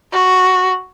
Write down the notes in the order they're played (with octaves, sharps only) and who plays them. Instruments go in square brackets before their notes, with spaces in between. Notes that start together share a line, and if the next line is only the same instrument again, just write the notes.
[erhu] F#4